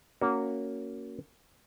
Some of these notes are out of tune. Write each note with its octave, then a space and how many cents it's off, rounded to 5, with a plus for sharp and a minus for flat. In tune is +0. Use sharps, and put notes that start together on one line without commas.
A#3 -10 C#4 +15 F#4 +0